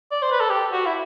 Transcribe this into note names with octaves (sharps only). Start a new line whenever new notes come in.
D5
C5
B4
A4
G4
F#4
E4